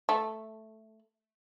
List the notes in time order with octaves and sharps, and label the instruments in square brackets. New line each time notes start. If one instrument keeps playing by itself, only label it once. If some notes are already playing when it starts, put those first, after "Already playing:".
[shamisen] A3